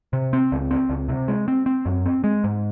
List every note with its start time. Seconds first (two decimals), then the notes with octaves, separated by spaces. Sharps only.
0.13 C3
0.33 C4
0.52 C#2
0.71 C4
0.89 C#2
1.08 C3
1.28 G#3
1.48 C4
1.66 C4
1.86 F#2
2.06 C4
2.24 G#3
2.44 G#2